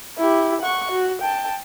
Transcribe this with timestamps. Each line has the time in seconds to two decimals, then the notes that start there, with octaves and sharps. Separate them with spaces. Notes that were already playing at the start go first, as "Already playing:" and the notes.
0.17 E4 G4
0.61 F#5 C#6
0.91 F#4
1.21 G5 A5